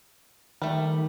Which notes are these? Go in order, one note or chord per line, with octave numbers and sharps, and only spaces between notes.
D#3 G3 A3